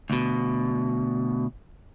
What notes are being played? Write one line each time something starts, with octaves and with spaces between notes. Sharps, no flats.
D2 B2